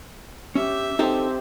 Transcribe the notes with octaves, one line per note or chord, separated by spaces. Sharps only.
C#4 G4 E5
C4 D#4 G4 A4 C5 D#5